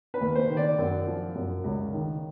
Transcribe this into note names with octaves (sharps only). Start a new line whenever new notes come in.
B4
D#2
C5
D#3
D5
F#2
F3
F#2
C#2
D#3